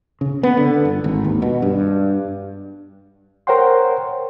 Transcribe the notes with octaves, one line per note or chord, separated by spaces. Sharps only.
C#3
B3
D3
G1
G#1
D#2
B2
G2
A#4 C5 C#5 F#5 G5 C6